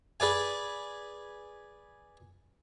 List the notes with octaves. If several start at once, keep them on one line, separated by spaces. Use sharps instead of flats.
G#4 B4 D5 G#5